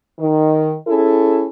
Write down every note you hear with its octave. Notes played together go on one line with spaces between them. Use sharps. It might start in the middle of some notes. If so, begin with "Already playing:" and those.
D#3
C#4 E4 G#4 A4